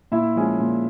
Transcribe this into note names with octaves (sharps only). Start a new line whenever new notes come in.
A#2 E4 E5
F3 G#3 C#4
A#2